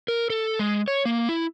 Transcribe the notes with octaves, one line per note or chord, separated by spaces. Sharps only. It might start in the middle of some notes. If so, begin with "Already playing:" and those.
A#4
A4
G#3
C#5
A#3
E4